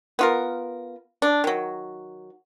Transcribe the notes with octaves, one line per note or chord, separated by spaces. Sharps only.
B3 F4 A#4
D4
D#3 F#3